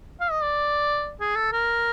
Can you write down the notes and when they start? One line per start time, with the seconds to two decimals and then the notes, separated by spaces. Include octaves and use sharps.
0.21 F5
0.31 D#5
0.43 D5
1.20 G#4
1.36 A4
1.53 A#4